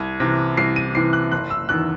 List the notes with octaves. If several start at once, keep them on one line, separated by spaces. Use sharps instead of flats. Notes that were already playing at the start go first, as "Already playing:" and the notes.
Already playing: C2 G#6
C3 E3
C2 C7
D#7
C3 E3 C7
F#6
F#1 F#6
E6
E2 D#3 F#6